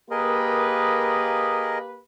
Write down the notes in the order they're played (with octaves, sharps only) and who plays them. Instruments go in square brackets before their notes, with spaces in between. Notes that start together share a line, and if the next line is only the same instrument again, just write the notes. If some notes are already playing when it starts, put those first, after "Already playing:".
[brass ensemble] A#3 G4 B4 [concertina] G#4 A#4 D#5